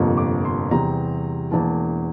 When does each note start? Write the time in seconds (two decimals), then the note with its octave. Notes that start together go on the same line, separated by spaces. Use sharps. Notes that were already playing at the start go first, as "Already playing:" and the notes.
Already playing: G1 F2 C3 F3 A#3
0.17 D6
0.45 C6
0.71 E2 C3 E3 G3 C4 A#5
1.51 E1 E2 E3 A#3 A5